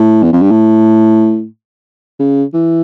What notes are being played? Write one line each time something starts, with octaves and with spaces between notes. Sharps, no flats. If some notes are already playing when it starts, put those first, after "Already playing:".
Already playing: A2
E2
F2
G2
A2
C#3
E3